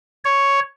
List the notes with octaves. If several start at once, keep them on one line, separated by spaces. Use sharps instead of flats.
C#5